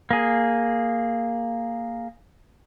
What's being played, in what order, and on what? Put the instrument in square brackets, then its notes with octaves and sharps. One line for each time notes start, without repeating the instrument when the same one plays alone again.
[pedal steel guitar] A#3 G#4